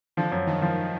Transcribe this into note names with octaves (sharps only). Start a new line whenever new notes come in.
D3 F3
F#2
D#3 F3
F3